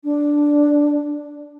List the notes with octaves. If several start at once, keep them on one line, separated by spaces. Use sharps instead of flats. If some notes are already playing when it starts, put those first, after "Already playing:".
D4